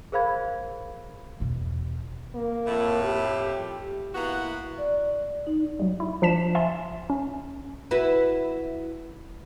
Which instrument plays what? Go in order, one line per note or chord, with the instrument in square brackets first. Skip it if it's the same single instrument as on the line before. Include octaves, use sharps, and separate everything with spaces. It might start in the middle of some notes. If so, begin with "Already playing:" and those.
[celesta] G#4 A#4 C5 F5 B5 G#6
[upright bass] E2 B2
[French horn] A#3
[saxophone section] F2 A2
[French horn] G4
[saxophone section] A#3 B3 F#4 [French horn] E4
[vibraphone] D5
D#4
[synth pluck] F#3 G3
E4
F3 D4 B6 E7
E5 F5 G#5 A5 C6
C#4
[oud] E4 F#4 B4